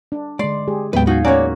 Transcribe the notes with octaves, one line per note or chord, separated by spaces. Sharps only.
D4
D3 G#3 D5 C6
G#3 G4 G#4
D#2 A2 F#3 G#3 B3 B4 G5
D#4 F4 F#4 G#4
A#3 C#4 F#4 C#5 D5 G#5 A#5